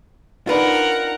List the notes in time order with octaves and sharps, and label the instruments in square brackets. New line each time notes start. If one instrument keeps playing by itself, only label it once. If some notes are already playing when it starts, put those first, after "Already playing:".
[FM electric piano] D4 D#4 [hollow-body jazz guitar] F4 B4 [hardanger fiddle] A#4 F#5